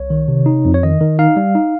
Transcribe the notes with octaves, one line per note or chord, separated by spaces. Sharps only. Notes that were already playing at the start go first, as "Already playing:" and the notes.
Already playing: C2 C#5
D#3
C3
D#4
F2
C#5
D#3 D#5
D#3
D#4 F5
G3
D#4